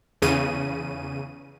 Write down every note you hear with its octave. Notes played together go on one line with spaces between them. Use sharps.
E2 C#3 D#7